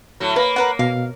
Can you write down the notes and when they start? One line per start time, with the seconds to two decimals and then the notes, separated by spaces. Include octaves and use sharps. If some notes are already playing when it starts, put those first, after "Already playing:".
0.20 A2 F#3
0.36 A#3 B4
0.56 A#4 B4 F#5
0.79 B2 F5